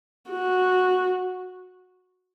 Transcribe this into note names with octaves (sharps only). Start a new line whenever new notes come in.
F#4